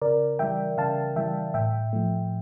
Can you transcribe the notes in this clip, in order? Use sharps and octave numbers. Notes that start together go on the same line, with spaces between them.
C#3 A#4 D5
E3 G3 E5 G5
C#3 F5 A5
E3 G3 E5 G5
A2 E5 G5
F3 A3